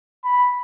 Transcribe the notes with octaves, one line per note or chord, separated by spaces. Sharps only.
B5